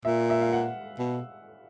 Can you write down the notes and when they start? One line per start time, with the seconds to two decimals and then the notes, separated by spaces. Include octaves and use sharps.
0.05 A#2 E5
0.30 E5
0.41 F5
0.53 F#5
0.99 B2